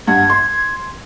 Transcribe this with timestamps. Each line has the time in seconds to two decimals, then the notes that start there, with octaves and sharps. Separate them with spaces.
0.07 G2 F#5 G#6
0.30 C6